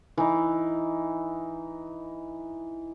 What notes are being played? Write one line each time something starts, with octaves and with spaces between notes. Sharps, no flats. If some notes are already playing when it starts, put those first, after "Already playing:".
E3 D#4